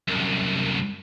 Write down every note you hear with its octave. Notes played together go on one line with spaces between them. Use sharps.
C2 F#2